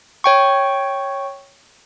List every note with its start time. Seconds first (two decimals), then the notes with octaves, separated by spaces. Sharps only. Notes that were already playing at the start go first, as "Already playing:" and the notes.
0.24 C#5 G5 C#6